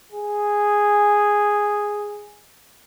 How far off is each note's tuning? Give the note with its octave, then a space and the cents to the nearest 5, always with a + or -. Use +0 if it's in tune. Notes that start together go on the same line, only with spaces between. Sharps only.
G#4 -5